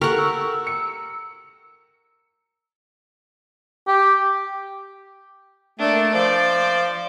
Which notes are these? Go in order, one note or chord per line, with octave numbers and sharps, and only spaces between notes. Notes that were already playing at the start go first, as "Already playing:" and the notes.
G4 A4 A#4 F#5 C#6
E6
C#7
G4
A3 A#3 D4
F3 C5 D5